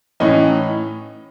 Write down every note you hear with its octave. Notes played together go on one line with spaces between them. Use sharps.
A2 E3 C#4 D#4